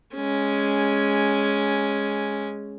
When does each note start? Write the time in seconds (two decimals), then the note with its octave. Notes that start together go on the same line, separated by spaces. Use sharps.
0.15 G#3 C#4